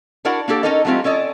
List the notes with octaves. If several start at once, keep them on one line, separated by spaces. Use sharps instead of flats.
D4 E4 F#4 A#4 D5 F#5
A#3 D4 G4 A4
C#4 D#4 E4 A4 A#4 D#5
F#3 G#3 A3 C4 F4 G4
C#4 A4 D5 D#5